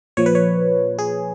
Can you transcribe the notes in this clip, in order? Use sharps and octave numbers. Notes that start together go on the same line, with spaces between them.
A#2 F3 C#5
B4
C#5
G#4